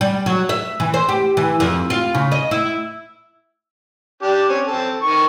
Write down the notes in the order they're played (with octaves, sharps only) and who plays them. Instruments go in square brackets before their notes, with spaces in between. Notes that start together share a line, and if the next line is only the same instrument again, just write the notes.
[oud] G3
F#3
E5
E3
C5
G4
E3
F2
F4
C#3
D#5
E4
[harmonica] D4 G4
C4 C#4
C4 A4
D#3 C#6